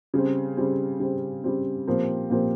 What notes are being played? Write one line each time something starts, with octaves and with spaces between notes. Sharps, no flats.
C#3 G3 C4
C#3 G3 C4
C#3 G3 C4
C#3 G3 C4
A#2 F3 C4 G4 A#4
A#2 F3 C4 G4 A#4